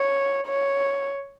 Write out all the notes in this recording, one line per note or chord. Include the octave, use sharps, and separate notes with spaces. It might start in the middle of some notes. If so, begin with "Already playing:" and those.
Already playing: C#5
C#5